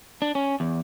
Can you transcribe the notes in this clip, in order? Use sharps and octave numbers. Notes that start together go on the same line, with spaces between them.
D4
C#4
E2